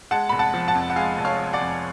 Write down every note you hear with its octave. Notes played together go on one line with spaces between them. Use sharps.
G#3 F#5 A5
F1 B5
F#5 A5
F3
F#5 A5
F2
F#5
G#3 F5 G#5
F1
C#5 F5
F3
D5 F#5
F2